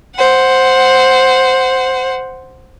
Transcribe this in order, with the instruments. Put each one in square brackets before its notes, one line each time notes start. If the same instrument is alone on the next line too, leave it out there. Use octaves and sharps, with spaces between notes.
[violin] C5 F#5